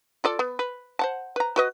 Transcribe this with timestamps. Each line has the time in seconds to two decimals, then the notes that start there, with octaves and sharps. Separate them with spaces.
0.24 F4 A4 D5
0.39 B3
0.59 B4
0.99 C5 F#5 A5
1.36 B4 A#5
1.56 F#4 B4 D#5